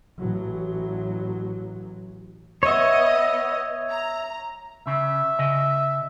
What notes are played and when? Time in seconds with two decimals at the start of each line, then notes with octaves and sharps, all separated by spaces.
0.18 A1 F#3
2.63 B3 C#5 D#5 E5
3.90 A#5
4.87 C#3 E5
5.39 C#3 D#5